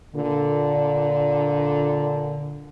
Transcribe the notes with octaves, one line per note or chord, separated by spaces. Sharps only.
A#2 D3